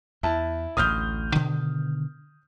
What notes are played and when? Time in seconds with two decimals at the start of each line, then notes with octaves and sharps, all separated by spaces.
0.23 E2 E4 A5
0.77 A1 D2 A2 D#6 F6 G6
1.35 B2 D3 D#3